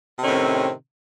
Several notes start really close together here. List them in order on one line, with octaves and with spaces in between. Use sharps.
C3 D#3 C#4 A2 C4